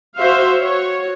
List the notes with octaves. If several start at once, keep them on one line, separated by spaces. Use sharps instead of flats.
F#4 C5 E5 F5
F#4 C#5